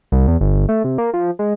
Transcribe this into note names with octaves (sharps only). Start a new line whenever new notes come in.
C2
E2
G1
A3
C3
A#3
F3
G#3